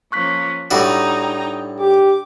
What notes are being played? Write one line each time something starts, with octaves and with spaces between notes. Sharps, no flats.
F3 A#3 C#4 C#6 F#6 B6
A2 G3 D4 D#4 F#4 D5 G5 A#5
G4 D6